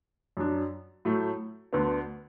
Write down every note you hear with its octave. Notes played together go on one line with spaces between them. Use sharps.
F#2 F#3 D4
A2 F#3 A3
D2 D3 B3